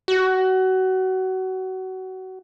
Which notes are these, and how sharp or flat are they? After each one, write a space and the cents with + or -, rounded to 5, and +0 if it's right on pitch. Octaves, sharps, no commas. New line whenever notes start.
F#4 +25